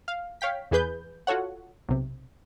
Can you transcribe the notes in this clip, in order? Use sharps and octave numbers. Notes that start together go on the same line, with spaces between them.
F5
C#5 F5 G5 B6
E2 E3 G#4 B4 G6
F4 F#4 A4 C#5 F#5
B1 C3